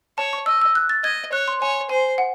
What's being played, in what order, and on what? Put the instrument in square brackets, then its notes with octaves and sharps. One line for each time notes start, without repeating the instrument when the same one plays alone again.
[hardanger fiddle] C#5 [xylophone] A5
[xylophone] C#6
[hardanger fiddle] D#5 [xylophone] E6
[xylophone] E6
F#6
A6
[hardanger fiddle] D#5 [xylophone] G#6
[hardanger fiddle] C#5 [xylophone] F#6
[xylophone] C6
[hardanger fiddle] C#5 [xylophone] G#5
[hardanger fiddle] C5 [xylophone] G#5
[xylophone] F#5